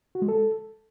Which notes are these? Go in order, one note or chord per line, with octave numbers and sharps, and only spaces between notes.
F#4
G#3
A4